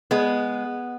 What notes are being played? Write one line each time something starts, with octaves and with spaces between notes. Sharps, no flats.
G#3 B3